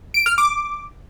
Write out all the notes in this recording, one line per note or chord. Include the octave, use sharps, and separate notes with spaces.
D7
F6
D6